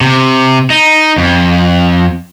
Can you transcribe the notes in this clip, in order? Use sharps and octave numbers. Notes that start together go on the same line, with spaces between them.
C3
D#4
F2